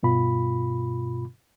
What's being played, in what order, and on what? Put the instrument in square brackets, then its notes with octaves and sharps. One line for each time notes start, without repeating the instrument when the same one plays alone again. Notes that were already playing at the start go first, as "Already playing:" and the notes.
[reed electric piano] G2 B2 F4 B5